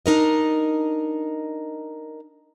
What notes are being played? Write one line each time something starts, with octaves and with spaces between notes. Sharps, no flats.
D4 D#4 A#4 D#5